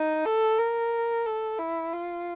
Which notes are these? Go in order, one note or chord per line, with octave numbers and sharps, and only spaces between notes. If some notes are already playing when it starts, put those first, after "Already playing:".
Already playing: D#4
A4
A#4
A4
E4
F4